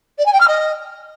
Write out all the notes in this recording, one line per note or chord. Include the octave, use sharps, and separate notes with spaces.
D5
G#5
G5
F6
D#5